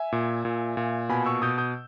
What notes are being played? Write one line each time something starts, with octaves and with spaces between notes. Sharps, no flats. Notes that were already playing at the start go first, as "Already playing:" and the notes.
Already playing: E5 G#5
A#2
A#2
A#2
B2 G#5 B5
C#6 E6
B2 D#6 G6
D#6 G6